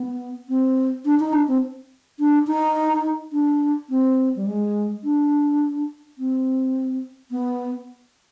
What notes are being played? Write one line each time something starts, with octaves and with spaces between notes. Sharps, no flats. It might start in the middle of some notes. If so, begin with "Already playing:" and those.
Already playing: B3
C4
D4
D#4
D4
C4
D4
D#4
D4
C4
G3
G#3
D4
C4
B3